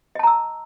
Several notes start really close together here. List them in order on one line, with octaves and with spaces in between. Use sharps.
D#5 A5 A#5 E6